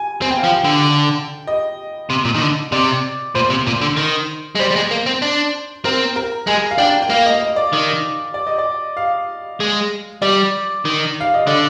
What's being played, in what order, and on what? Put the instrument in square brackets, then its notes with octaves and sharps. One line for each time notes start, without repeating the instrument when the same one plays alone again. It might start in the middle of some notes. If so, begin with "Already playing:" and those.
Already playing: [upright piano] G#5
[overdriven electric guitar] C4 [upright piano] G#5
[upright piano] G5
F5
[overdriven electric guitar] F3
[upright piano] G5
[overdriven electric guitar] D3
[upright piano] D#5
[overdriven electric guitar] C3
A#2
D#3
D3
[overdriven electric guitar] C3 [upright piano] D5
[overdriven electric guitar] A#2 [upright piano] C5
[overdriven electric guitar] C3
A#2
D3
D#3
G#3
[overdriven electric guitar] G3 [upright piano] C5
[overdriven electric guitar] G3
G#3
A#3
C4
D4
[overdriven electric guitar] C4 [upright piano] A#4
[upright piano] A#4
[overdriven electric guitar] G#3 [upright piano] G#5
[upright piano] F5
[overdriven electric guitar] D4 [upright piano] G5
[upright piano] G5
[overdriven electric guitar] A#3 [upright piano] F5
[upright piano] D#5
D#5
D5
[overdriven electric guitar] D#3
[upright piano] D5
D#5
D5
F5
[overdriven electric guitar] G#3
[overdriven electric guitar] G3 [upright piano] D5
[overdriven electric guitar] D#3
[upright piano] F5
D#5
[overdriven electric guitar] D3 [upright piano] D5